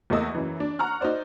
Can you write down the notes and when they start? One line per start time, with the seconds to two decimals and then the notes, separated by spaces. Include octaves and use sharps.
0.10 E2 A3 A#3 D#5 E6
0.35 F#2 E3
0.60 D4
0.79 F#5 A#5 C#6 F6 F#6
1.01 D#4 F#4 C5 D5